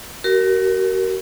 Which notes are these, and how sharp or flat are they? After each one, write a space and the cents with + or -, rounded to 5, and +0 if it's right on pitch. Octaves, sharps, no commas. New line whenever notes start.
F#4 +40 A#4 +0